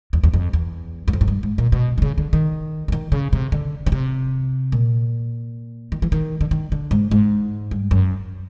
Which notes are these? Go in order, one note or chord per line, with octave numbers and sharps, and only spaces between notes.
E2
E2
F2
E2
F#2
F2
G#2
G2
G#2
A#2
B2
D3
C#3
D3
D#3
D3
D#3
C#3
C3
D3
C#3
C3
A#2
D#3
E3
D#3
D3
D#3
D3
G#2
G#2
G2
F#2